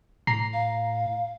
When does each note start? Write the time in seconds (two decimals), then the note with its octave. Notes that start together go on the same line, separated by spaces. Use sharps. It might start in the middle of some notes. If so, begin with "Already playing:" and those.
0.27 A2 A#5 C7
0.53 F5